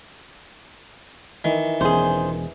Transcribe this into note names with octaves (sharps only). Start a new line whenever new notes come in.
D#3 E3
E1 E2 C#4 G#4 C5